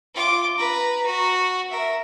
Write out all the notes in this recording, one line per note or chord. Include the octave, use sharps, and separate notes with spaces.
F4 D6
B4 A#5
F#4
A#4 E5